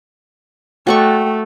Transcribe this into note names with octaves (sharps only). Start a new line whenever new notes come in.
A3 F#4 D5 G5 C#6